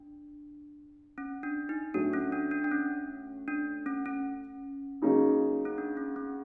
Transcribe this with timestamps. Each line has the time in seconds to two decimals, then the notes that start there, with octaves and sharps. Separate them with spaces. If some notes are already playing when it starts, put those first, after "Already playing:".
Already playing: D4
1.18 C#4
1.43 D4
1.69 D#4
1.94 A2 F#3 A3 D4
2.13 C#4
2.32 D4
2.51 D4
2.64 D4
2.71 C#4
3.48 D4
3.86 C#4
4.06 C#4
5.02 C#3 F#3 A#3 D#4 G#4
5.65 C#4
5.78 D4
5.97 C#4
6.16 C#4